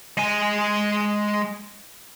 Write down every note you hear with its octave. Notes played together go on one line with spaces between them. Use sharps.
G#3 G#5